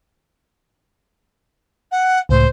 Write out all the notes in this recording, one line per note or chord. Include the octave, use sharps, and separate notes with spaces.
F#5
C#2 A2 C5